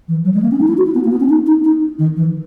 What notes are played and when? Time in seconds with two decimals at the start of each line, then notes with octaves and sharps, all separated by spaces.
0.08 E3
0.25 F#3
0.34 G#3
0.42 A#3
0.51 C#4
0.60 D#4
0.68 E4
0.78 F#4
0.86 E4
0.95 B3
1.04 A#3
1.12 B3
1.20 C#4
1.29 D#4
1.46 D#4
1.64 D#4
1.99 D#3
2.16 E3